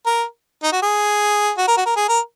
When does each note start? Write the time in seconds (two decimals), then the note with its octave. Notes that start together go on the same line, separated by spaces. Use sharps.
0.06 A#4
0.63 D#4
0.73 F#4
0.83 G#4
1.58 F#4
1.68 A#4
1.77 F#4
1.86 A#4
1.96 G#4
2.09 A#4